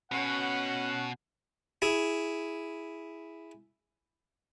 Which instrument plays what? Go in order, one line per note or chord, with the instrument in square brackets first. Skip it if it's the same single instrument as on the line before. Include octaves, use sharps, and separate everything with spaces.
[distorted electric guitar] B2 [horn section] C#4 F#5
[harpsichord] E4 G#4